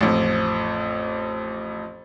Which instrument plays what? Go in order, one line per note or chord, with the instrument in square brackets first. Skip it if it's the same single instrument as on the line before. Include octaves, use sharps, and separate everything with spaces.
[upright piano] A1 F2